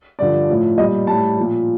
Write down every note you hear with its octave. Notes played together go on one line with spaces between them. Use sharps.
G2 D3 F3 D5
A2 F3
A#2 G3 D#5
A2 G3 A5
A#2 F3